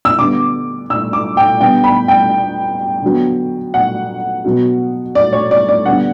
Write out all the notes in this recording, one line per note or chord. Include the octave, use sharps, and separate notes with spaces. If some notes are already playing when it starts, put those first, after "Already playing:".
E6
D3 G3 B3 D6
E6
D6
G5
D3 G3 B3 G5
B5
G5
D3 F#3 B3
F#5
B2 F#3 B3
D5
C#5
D5
D5
D3 G3 B3 F#5